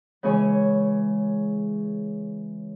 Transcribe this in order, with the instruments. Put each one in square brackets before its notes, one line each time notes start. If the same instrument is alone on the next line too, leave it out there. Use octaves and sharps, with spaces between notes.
[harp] C#3 E3 G#3 C#4 C#5 G#5